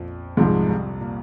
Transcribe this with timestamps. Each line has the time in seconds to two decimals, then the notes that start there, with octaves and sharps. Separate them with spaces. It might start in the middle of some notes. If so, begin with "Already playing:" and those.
Already playing: A#1 F2 A#2 F3
0.37 C2 G#2 C3 F3 G#3
0.69 C2 C3
1.01 A#2